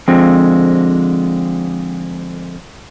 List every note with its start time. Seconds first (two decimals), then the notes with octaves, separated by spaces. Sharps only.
0.08 D3 F3 G#3 C4